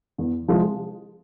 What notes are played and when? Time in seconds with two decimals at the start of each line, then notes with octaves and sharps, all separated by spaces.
0.18 E2
0.48 C3 F3 G#3